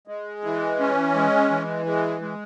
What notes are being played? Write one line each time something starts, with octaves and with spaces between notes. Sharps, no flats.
G#3
E3
C#4
G#3
E3
G#3
G#3